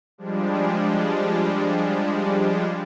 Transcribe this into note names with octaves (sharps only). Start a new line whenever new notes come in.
F3 G3 G#3 D4